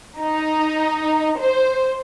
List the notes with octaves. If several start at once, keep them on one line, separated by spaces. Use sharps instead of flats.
D#4
C5